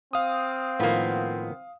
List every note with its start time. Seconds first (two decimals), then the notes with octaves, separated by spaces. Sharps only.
0.13 C4 F5 D#6
0.80 A2 D#3 F3 A#3 B3